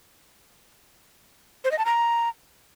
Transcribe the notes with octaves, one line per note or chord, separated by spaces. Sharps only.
C5
D#5
A5
A#5